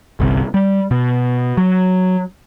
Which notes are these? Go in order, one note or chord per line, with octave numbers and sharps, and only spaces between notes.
G1 C2 C3
G3
B2
F#3